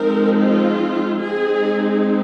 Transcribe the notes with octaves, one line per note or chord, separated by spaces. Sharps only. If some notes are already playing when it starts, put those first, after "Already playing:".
Already playing: F3 G#3 C4 D#4 A#4
F4
G#3 C4 D#4 G#4